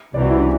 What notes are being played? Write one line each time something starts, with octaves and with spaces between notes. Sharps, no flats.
C2 C3 E3 D5
F#4
E4
D4